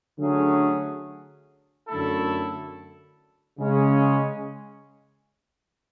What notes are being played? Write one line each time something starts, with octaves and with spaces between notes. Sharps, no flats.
D3 F#3 A3 C#4 G#4
F#2 D3 A3 E4 A4
C#3 G#3 C#4